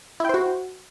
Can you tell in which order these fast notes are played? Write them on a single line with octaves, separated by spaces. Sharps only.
E4 G5 C5 F#4